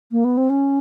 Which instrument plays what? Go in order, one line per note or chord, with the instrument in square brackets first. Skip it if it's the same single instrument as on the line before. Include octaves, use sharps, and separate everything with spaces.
[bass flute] A#3
B3
C4
C#4